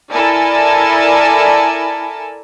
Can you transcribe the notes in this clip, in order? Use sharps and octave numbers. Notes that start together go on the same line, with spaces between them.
E4 A4 A#4 D5 G#5 A5